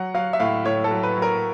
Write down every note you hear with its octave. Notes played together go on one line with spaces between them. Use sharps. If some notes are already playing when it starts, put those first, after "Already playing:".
Already playing: F#3 F#5
F#3 F5
E5
A2 F5
A2 C#5
A4
F#3
B4
F#3
A#4